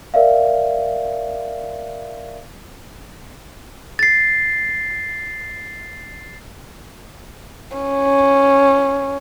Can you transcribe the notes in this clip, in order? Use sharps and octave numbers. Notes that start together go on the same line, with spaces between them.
A#4 D5 E5 F5
A6 C7
C#4